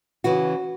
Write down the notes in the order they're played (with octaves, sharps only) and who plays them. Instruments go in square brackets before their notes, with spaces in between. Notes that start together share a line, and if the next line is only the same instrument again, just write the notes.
[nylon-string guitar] C#3 E3 F#4